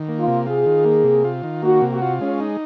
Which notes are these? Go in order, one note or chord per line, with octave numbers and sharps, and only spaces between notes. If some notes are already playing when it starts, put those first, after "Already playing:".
Already playing: D#3
A#3
F4
C3
F4 G#4
D#3
A#3
C3
F4
D#3
A#3 F#4
C3
F#4
F4
G#3 C#4
D#4